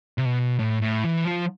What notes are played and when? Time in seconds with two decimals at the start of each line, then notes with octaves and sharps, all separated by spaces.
0.18 C3
0.25 B2
0.59 A2
0.81 A2
1.04 E3
1.25 F3